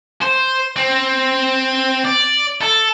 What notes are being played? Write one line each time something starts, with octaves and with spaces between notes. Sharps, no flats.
C5
C4
D5
A4